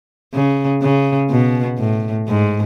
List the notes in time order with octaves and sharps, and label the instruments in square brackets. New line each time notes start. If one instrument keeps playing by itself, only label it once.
[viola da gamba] C#3
C#3
B2
A2
G#2